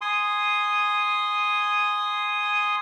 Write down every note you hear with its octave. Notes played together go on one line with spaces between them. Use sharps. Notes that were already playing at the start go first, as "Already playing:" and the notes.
G#5 C6 D#6